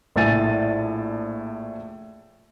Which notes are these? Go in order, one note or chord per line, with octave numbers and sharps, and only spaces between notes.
A#1 A2 G#5 A6 D#7